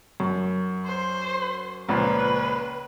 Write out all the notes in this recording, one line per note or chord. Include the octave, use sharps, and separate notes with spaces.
F#2
C5
C#2 A#2 F3 B4